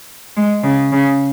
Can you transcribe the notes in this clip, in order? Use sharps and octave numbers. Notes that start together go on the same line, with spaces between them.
G#3
C#3
C#3